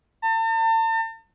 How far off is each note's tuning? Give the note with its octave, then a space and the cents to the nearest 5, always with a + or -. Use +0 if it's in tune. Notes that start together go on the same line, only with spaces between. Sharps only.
A5 +40